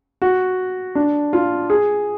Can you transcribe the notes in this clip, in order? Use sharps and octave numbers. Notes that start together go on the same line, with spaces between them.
F#4
D4
F4
G#4